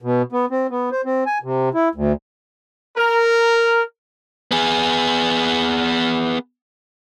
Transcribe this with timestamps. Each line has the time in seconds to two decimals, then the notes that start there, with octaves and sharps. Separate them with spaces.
0.02 B2
0.32 B3
0.50 C4
0.70 B3
0.92 C5
1.05 C4
1.26 G#5
1.43 C3
1.74 E4
1.95 D2
2.97 A#4
4.51 B3 G#4